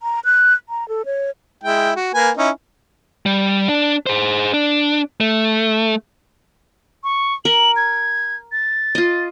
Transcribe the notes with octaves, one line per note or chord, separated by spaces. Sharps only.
A#5
F#6
A#5
A4
C#5
G#3 E4 G5
F#4
A#3 B4 G#5
C#4 D#4 E4
G3
D4
G#4 C5
D4
A3
C#6
A#4 F#7
G#6
A6
F4 D#5